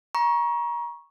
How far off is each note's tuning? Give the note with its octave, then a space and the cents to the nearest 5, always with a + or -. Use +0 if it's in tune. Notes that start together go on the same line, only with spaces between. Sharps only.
A#5 +30 C#6 +0